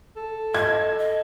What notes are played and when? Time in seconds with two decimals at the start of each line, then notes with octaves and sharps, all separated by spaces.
0.16 A4
0.55 D#5 G#6
0.98 D#5